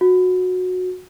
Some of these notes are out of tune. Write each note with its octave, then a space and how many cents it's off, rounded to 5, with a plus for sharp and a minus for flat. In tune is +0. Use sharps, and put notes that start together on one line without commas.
F#4 -15